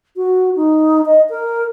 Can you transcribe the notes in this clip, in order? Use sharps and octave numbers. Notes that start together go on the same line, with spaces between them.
F#4
D#4
D#5
A#4